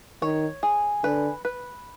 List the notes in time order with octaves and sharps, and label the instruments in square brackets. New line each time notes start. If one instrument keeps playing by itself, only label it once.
[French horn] D#3 [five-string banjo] C#5
[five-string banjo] G#4
[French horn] D3 [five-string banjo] B4
[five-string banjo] B4